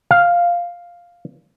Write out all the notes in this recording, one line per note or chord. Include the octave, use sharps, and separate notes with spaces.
F5